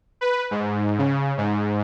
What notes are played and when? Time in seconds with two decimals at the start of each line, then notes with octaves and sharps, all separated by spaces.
0.21 B4
0.51 G#2
0.98 C#3
1.37 G#2